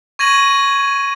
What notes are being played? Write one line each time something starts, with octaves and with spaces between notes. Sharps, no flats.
C#6 G#6 A#6 D#7 F#7